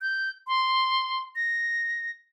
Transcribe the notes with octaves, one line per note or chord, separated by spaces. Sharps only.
G6
C6
A#6